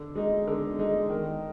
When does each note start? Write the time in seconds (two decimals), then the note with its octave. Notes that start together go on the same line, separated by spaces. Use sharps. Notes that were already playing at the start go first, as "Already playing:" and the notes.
Already playing: D3
0.15 G#3 D#4
0.47 D3
0.79 G#3 D#4
1.10 D#3